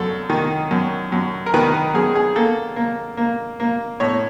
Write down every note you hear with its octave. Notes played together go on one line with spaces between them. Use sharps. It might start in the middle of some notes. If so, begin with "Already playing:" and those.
Already playing: F#2 A4
D#3
F#2
F#2
A#4
D#3 B4
A#4
F#2 G#4
G#4
A#3 A4
A#3
A#3
A#3
A2 C#5